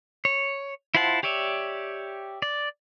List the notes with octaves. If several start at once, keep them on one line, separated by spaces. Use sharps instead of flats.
C#5
E4 F4 C5 F#5 A5
G4 C#5 D5 E5
D5